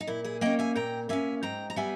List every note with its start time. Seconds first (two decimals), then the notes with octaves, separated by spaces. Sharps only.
0.01 D#4
0.07 A#2 E4
0.24 E4 G#4
0.41 A#3 C#4 D#5 G5
0.59 E5 G#5
0.76 A#2 G5 A#5
1.09 A#3 C#4 E5 G#5
1.43 G#2 G5 A#5
1.70 A#5
1.76 G3 B3 E5 G#5